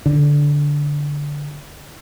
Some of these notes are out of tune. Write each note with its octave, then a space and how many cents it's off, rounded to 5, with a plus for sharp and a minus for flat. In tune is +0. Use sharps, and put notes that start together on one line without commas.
D3 -10